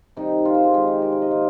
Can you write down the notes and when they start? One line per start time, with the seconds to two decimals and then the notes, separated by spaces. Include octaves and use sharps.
0.17 C3 D#3 G3 D#4
0.45 F4
0.55 C5
0.64 G#4
0.73 D#3 G#3 C4 G4
0.88 G4
1.02 A#4
1.12 C5
1.22 D#5
1.31 D#3 A#3 F5